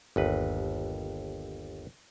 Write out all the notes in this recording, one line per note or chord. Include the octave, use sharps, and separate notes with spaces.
G1 D#2 B4